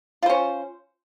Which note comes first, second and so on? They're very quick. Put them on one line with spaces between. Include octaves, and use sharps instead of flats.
F4 C5 C#4